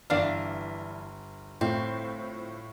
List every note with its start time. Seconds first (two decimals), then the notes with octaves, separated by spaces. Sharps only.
0.10 G1 E3 D4 D5 F5 G5 F6
1.61 A2 C4 F4